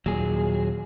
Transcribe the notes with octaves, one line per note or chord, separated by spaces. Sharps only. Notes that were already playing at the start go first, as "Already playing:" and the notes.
D#2 A#2 F#3 G#4